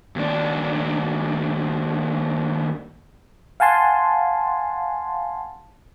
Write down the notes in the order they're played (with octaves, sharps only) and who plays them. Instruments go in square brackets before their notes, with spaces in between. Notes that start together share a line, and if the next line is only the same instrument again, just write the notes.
[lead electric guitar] D#2 D4
[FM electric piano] F5 F#5 G#5 A5 C6